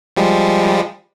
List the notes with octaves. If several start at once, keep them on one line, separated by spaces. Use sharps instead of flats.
F3 G3 G#3